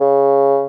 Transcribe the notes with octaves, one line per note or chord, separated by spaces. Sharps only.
C#3